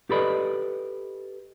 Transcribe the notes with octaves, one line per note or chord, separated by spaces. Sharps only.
G4 A4 B4 D5 D#5